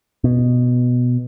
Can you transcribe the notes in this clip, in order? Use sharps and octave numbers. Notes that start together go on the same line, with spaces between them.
B2